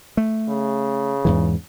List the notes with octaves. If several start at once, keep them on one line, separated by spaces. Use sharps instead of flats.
A3
C#3
E2 G#2 E3